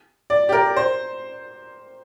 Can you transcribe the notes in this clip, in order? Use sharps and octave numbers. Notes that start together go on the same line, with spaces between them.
D5
G4
A#4
C5